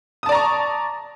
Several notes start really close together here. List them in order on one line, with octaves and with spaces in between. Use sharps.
D#6 A5 D5 A#5 C#6